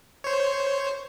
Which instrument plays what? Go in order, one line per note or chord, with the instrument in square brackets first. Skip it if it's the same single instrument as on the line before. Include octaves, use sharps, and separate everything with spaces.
[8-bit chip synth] C5 C#5